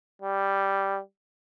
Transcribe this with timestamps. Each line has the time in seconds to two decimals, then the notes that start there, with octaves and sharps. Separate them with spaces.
0.21 G3